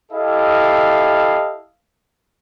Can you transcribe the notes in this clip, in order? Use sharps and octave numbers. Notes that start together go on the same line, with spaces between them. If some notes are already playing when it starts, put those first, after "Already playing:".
E4 G4 A4 D#5 F5